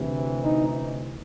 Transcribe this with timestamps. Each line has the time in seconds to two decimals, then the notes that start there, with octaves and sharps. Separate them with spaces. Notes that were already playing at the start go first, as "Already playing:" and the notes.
Already playing: D2 C3 E3
0.43 D#4